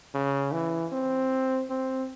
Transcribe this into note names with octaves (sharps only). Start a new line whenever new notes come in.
C#3
E3
C4
C4